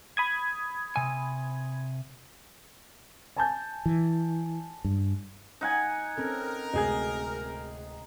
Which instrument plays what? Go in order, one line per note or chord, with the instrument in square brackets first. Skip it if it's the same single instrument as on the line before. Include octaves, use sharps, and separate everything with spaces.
[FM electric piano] B5 D#6 G#6
[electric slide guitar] C3 G#5
[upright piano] G#5 A5 G6
[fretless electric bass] E3
G2
[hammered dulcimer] D#4 F#5 G#5
[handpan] C4 C#4 A4 [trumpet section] A#4
[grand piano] D1 G#4 G#6 [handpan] C3 G#3 D#5